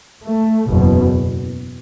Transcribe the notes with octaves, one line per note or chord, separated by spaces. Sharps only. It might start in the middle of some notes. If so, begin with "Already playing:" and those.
A3
F#1 E2 B2